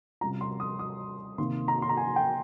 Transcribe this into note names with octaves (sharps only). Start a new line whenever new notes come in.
C3 G3 C#4 F4 A#5
C6
D#6
D#6
C3 D#3 A#3 D#4 C6
A#5
C6
A#5
G#5
G5